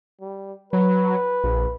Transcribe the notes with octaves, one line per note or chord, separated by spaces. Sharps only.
G3
F#3 B4
A#1